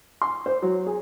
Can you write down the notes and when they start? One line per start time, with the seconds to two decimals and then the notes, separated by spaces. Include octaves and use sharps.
0.22 C6
0.46 C5
0.62 F#3
0.87 G#4